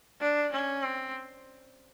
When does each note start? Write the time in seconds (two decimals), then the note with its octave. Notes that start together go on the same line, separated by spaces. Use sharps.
0.21 D4
0.52 C#4
0.83 C4